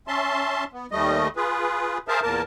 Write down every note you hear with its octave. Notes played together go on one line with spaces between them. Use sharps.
C#4 E5 A5 C6
B3
D#2 G3 A3 D#5
F4 G#4 B4
G#4 A#4 C5 E5 F5 A5
E2 A#2 A#3 A#4 A5